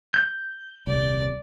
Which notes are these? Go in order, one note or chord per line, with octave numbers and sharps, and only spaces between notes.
G6
D#1 C2 D5